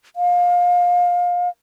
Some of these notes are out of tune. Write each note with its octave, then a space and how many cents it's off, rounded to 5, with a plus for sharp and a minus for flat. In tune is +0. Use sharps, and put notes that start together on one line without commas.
F5 +25